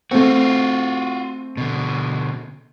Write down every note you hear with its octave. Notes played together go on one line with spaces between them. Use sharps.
A3 C4 F4 F#4
B2 D3